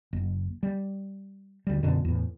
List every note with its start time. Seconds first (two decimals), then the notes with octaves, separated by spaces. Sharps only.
0.13 F#1
0.63 G3
1.67 D2 G3
1.83 F#2 B2 D3
2.05 E2 A2